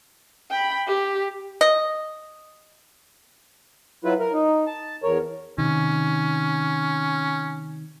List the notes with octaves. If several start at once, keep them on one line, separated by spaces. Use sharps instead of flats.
G5 B5
G4
D#5
F#3 E4 F4 B4
A#4
D#4
A5
E2 A#4 C#5
C3 D#3 C#4